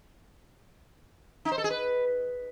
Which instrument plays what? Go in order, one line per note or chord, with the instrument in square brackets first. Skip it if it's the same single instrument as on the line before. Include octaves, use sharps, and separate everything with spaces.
[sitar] D#4
C5
A4
G#4
B4